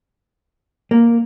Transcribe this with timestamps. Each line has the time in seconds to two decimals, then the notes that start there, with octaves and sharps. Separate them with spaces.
0.91 A#3